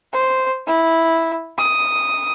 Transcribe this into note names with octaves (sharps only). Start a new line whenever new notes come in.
C5
E4
D#6